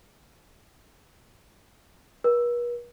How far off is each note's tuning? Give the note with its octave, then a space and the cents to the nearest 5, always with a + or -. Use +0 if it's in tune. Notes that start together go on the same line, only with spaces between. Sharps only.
B4 -45